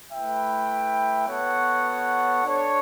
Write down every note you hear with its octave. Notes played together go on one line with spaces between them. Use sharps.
A3 E4 B4 E5 G5
B3 F#4 A4 C#5 F#5
D4 A4 C#5